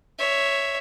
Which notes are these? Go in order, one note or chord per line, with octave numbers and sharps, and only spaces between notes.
C#5 E5